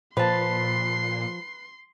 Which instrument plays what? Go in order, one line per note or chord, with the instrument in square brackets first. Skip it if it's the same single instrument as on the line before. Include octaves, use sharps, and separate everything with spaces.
[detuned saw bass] A#2 [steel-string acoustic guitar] F3 [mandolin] B4 A5 [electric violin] C6 C7